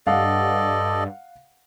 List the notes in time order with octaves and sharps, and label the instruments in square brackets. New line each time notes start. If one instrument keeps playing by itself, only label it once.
[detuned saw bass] G2 [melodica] A4 D5 D#5 [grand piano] F5 F#5